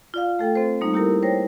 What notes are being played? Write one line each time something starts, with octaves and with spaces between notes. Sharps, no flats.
F4 D5 F5
A3 A4 G5
C4 A4 C5
G3 A#3 D#4
A#3 E4 G4 A4 A#4
C5 C#5 G5 A#6